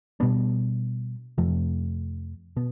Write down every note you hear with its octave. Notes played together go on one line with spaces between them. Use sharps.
B2 G3 B3 D4
F2 C3 F3 A3
B2 B3